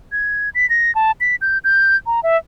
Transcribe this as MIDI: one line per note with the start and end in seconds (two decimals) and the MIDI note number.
0.12 0.50 92
0.55 0.69 95
0.70 0.94 94
0.95 1.12 81
1.21 1.36 95
1.41 1.58 91
1.64 1.96 91
2.06 2.20 82
2.23 2.37 76